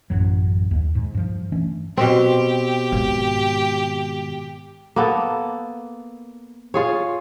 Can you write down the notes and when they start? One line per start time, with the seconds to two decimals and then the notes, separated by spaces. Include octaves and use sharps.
0.10 A1 F#2 F#3
0.71 D#2
0.95 G#2
1.14 G2 F3
1.52 E3 A3 C#4 D4
1.97 B2 C4 G4
2.92 G#2 D#3
4.96 A#3 B3 A4
6.74 F4 G#4 C#5